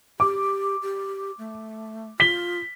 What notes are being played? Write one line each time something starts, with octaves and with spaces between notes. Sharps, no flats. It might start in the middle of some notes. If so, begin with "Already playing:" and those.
G4 D6
G4
A3
F4 B6 G7